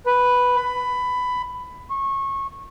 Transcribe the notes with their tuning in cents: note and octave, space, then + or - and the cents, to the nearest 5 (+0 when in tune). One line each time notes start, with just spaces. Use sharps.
B4 +0
B5 +15
C#6 -25